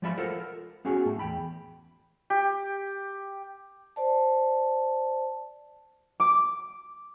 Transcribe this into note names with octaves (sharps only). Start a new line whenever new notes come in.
F3 G#3 A3 D5 E5 B5
F4 A4 A#4 C5 F#5
A#4
B3 C#4 F#4 G#4
A2 A3
E2 G5 B5
G4
C5 D5 A5
D6